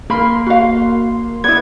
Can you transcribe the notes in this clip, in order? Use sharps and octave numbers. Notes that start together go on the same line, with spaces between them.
A#3 A#4 B5 C6
F#4 F5
B3 E4 D5 G#6